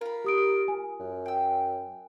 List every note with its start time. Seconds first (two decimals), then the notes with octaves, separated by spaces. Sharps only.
0.01 F4 A#4 B5
0.24 G4 D#6 D7
0.68 G#5
1.00 F#2
1.26 G5 E6